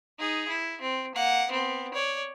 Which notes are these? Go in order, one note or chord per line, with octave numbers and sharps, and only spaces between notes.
D#4 G#4
E4
C4
A#3 F#5
B3 C4
C#5 D5